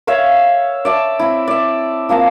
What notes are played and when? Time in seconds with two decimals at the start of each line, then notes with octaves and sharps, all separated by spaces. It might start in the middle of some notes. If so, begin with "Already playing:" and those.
0.07 C#5 E5 F5 C#6
0.85 D5 E5 A5
1.19 C4 E4
1.48 D5 E5
2.09 F3 A#3 C4 A5